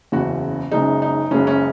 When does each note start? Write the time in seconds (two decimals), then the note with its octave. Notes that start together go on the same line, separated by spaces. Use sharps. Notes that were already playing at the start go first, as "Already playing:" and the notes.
0.12 F#1 E2 C#3 F#4
0.71 F#1 F#2 C#3 G#3 D#4
1.02 D#4
1.31 F#1 F#2 C#3 G#3 C#4
1.47 C#4